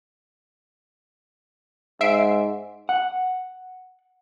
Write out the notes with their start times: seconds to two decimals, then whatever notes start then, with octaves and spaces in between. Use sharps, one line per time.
2.01 G#2 E5 C7 D7
2.89 F#5